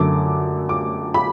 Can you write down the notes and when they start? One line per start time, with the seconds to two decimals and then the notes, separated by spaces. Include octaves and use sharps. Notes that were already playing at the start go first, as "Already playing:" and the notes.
Already playing: F#2 D3 F#3 A3 D6
0.69 D6
1.14 B5